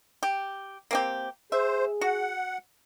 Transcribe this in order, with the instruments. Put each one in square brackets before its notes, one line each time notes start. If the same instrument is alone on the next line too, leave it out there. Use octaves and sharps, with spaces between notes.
[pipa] G4
A#3 C4 G4
[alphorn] G#4 [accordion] C5 [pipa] E5
[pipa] F#4 [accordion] F#5